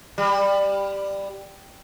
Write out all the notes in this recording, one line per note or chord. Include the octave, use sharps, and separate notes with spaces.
G3